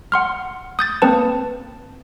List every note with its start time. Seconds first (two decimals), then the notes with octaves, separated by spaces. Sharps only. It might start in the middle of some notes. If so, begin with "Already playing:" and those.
0.12 F#5 C6 F6
0.79 D#6 G6 A6
1.02 A#3 C4 B4 A5